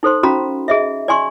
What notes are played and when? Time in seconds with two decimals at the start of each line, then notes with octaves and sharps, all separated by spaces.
0.03 D#4 A4 C5 C6
0.23 C#4 F#4 F5 A#5 B5
0.68 G#4 D#5 E5
1.08 D5 G#5 C6 C#6